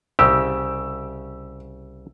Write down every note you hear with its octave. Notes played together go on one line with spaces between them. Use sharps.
C2 C#3 G4 E6